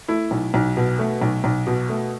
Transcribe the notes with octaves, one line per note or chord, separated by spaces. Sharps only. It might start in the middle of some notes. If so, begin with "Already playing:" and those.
A3 E4
B1
B1
B2
A3
B1
B1
B2
A3